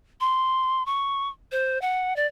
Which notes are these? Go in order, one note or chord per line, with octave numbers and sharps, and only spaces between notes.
C6
C#6
C5
F#5
D5